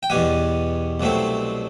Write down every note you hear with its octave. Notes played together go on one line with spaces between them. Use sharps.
G5
E2 B2 G3 F#5 G#5
C2 B2 F#3 A3 C4